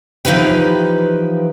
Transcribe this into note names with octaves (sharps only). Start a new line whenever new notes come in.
E3 F3 D#4 G4 B4 G5